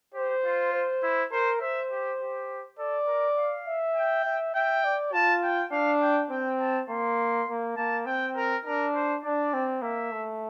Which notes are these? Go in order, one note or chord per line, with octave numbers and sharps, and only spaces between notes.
G4 C5
F4
C5
E4
A#4 C5
C5 E5
G4
G4
A4 D5
A#4
F5
E5
G5
E5
E5 G5
D5
F4 A5
G5
D4 F5
G5
C4 G5
A5
A#3 C6
A#3
A#3 A5
C4 G5
A#4
D4 A#4
C5
D4 D5
C4
A#3 E5
A3